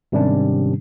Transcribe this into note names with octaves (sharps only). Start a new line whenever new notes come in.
G#2 C3 D#3 G3 C#4 D4